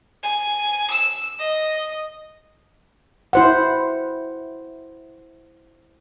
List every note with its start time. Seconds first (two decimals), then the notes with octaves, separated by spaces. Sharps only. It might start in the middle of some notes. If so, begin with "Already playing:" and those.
0.23 G#5
0.90 E6
1.39 D#5
3.33 E4 C5 F#5